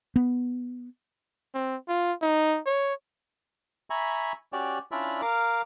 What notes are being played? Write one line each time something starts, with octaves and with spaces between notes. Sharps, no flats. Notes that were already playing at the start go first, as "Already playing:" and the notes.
B3
C4
F4
D#4
C#5
E5 G#5 A#5 B5 C#6
C#4 F#4 G4 D5
C#4 D4 E4 F4 D5 E5
A#4 F5 D6